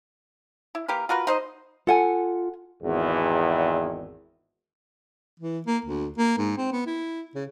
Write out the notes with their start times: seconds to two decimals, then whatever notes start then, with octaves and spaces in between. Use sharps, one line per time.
0.75 E4
0.88 A#3 G4 A#4 B4
1.09 F4 F#4 A#4 B4
1.27 D#4 C5 D#5
1.87 F4 A4 F#5 G#5
2.82 G#1 E2
5.40 E3
5.66 A#3
5.85 D2
6.18 A#3
6.38 G#2
6.57 C4
6.72 B3
6.86 E4
7.35 C#3